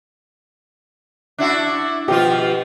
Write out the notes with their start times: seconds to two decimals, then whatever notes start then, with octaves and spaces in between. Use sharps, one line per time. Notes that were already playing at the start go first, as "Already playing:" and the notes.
1.38 D4 E4 F#4
2.08 B2 F3 F4 G4